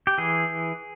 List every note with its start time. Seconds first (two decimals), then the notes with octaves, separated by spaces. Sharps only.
0.07 G4
0.18 E3 G#4